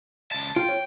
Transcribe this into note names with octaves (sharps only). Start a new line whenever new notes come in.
C#2 A5
F4 G5
C#5